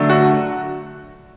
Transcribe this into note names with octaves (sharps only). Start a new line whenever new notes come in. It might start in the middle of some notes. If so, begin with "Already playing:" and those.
Already playing: D3 F#3 A3 D4
F#4